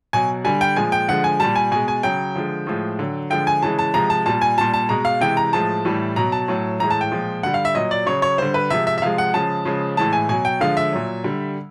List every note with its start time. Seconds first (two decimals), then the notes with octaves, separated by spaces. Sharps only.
0.13 B2 F#3 G#5
0.44 D3 G3 G#5
0.61 G5
0.76 A#2 F3 G#3 G#5
0.92 G5
1.08 D3 F3 G#3 F#5
1.24 G#5
1.40 A#2 G3 A5
1.56 G#5
1.71 B2 G#3 G#5
1.88 G#5
2.03 C#3 F#3 G5
2.35 D3 F3 G#3
2.67 A2 F3 G#3
2.99 D3 F#3
3.30 D3 F3 G#3 G5
3.47 G#5
3.62 C#3 E3 G#3 A5
3.79 A5
3.94 C3 F3 G#3 A#5
4.10 A5
4.26 A#2 G3 A5
4.41 G#5
4.58 A#2 G3 A5
4.74 A5
4.89 B2 G#3 A#5
5.05 F5
5.21 C3 E3 G#3 G5
5.37 A#5
5.53 A2 F3 G#3 A5
5.85 A2 E3 G3
6.16 B2 F#3 A#5
6.32 A5
6.48 A2 F#3
6.80 A2 E3 G#3 A#5
6.90 A5
7.01 G5
7.11 A#2 F3 G#3
7.43 D3 G3 F#5
7.54 F5
7.65 E5
7.75 A#2 F#3 D#5
7.91 D5
8.06 C#3 F#3 C#5
8.22 C#5
8.38 D3 G3 C5
8.54 B4
8.70 C3 F3 G#3 E5
8.87 E5
8.98 E5
9.02 C3 F3 G#3 F5
9.18 F#5
9.34 C#3 F3 G#3 A5
9.65 C#3 F3 G#3
9.97 A2 E3 G#3 A5
10.13 G#5
10.29 B2 F#3 G#5
10.45 G5
10.61 D3 F3 G#3 F5
10.77 E5
10.92 A#2 F#3
11.24 D3 G3